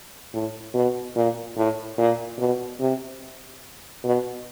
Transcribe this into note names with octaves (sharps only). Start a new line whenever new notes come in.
A2
B2
A#2
A2
A#2
B2
C3
B2